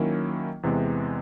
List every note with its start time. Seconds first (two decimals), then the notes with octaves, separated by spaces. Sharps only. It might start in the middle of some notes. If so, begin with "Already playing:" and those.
Already playing: D#3 F#3 A#3 C#4 E4
0.63 E2 C3 E3 G#3 B3